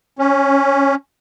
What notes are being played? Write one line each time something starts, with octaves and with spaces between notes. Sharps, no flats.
C#4